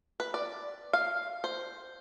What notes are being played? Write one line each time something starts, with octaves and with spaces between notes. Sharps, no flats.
B4
D5
F5
C5